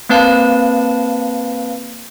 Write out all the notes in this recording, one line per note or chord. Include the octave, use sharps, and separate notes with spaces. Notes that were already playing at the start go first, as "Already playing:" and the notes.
A#3 C4 B4 F5 A5